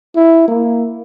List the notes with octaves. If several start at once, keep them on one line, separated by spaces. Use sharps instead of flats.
E4
A#3